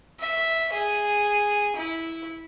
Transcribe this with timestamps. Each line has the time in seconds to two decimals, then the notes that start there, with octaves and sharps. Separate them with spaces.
0.20 E5
0.73 G#4
1.77 E4